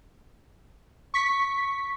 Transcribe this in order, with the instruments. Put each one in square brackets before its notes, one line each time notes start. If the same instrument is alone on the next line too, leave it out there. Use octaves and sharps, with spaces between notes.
[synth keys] C#6 B6